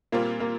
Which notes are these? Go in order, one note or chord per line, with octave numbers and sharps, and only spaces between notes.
A#2 G3 A#3 C4 F4
A#3